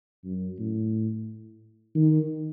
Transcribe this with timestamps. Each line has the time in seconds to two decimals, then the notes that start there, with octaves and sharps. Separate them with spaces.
0.25 F#2
0.59 A2
1.95 D#3